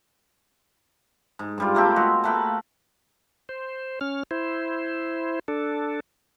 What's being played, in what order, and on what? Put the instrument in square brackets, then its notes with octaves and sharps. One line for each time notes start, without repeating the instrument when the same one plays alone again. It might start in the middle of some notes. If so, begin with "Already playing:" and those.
[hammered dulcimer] G#2
G2 G3 F4
A3 A#3 C4 G4
G#3 F#4 G#4
A3 A#3 B4 G5
[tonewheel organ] C5
C#4 F6
E4 C5
D4 A4